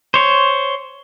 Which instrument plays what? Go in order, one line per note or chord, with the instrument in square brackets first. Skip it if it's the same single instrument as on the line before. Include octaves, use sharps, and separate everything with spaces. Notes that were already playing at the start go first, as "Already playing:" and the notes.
[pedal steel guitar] C5 C#5